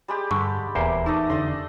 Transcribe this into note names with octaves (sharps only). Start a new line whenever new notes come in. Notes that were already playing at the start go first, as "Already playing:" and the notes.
G3 G#3 G4
G2 D3 C#6
D#1 E2 A#3 G4 C5
A3 D#4 A4 D#5
F2 D3 D5 D#5 C6